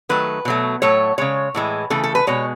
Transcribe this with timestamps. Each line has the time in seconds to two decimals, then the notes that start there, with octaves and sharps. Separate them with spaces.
0.09 D#3 F#3 A3 B4
0.45 B2 F#3 A3
0.82 A2 F#3 A3 C#5
1.18 C#3 G#3 C#5
1.54 A2 E3 G#3
1.90 C#3 E3 A3 A4
2.04 A4
2.15 B4
2.27 B2 G#3 C#5